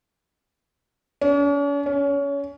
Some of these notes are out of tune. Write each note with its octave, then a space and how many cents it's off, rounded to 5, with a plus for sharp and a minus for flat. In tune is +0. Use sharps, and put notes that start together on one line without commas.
C#4 +45
C#4 +25